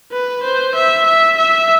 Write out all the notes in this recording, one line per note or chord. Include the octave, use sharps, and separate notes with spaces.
B4
C5
E5
E5
E5